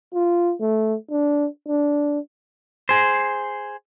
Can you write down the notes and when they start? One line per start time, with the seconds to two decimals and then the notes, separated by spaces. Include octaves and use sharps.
0.13 F4
0.61 A3
1.11 D4
1.68 D4
2.89 G#4 C5